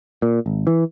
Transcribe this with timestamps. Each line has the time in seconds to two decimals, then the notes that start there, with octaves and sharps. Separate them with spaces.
0.22 A#2
0.46 G#1
0.67 E3